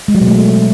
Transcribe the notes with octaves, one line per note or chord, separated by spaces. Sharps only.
G#3
F#3
B2
A3